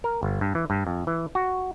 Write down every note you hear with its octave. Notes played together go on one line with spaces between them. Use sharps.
A#4
G1
G2
E3
G2
F2
E3
F#4